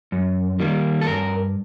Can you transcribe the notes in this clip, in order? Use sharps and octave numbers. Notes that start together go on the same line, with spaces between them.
F#2
D#3 G3 A#3
A4
G2 A#4